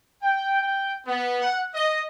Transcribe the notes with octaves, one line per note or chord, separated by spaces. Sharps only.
G5
G5
B3
F#5
D#5